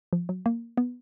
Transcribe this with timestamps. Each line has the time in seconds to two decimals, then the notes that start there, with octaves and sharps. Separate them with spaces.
0.13 F3
0.29 F#3
0.46 A#3
0.77 B3